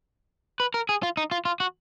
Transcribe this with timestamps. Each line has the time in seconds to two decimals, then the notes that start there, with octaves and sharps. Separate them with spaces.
0.60 B4
0.74 A#4
0.89 G#4
1.03 F4
1.17 D#4
1.31 F4
1.45 F4
1.60 F#4